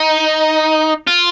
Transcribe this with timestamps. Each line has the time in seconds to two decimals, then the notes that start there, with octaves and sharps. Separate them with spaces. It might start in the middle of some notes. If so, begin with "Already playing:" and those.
Already playing: D#4
1.07 F4